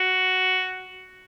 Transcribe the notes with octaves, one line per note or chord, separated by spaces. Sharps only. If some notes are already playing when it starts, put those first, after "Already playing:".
Already playing: F#4